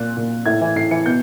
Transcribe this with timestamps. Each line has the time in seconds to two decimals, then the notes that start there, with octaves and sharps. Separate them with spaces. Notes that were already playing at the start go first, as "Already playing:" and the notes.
Already playing: A#2 F#6
0.17 A#2
0.46 A2 G#6
0.61 E3
0.76 A2 C7
0.91 E3 C#7
1.06 B2 G6